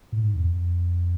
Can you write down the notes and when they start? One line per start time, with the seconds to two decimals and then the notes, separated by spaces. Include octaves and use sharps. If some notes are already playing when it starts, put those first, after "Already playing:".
0.12 A2
0.23 G#2
0.35 E2
0.47 F2